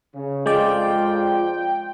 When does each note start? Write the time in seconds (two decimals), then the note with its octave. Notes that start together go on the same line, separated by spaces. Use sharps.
0.13 C#3
0.46 F2 G#3 F4 D5 G5